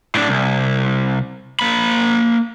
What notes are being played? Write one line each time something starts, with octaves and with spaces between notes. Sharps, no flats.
A2 D4
C2
A#3 B5